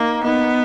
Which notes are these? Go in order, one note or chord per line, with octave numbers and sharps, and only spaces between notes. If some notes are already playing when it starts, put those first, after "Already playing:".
Already playing: A#3 D#4
B3 D#4